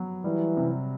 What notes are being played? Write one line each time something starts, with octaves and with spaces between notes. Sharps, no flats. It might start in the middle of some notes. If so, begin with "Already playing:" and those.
Already playing: F#3 B3
E3 G3
C3